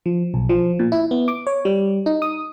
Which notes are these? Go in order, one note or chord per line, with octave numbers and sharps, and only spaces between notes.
F3
B1
F3
A#2
E4
B3
D6
C#5
G3
D#4
D#6